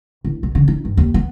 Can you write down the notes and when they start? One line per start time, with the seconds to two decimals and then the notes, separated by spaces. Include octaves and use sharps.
0.25 D1
0.43 B1
0.55 D3
0.68 D#4
0.85 G2
0.97 D#2
1.14 B3